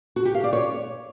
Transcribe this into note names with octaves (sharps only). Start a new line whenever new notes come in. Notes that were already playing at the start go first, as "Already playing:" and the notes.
F#4
G4
F5
D5
C#5